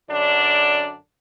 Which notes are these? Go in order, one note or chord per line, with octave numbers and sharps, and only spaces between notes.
F#2 D3 D4 D5